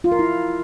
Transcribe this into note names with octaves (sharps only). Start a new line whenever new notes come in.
F4
A#4
E4